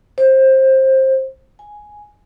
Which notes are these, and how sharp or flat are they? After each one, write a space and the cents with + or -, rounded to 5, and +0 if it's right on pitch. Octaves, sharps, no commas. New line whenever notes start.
C5 +20
G#5 +5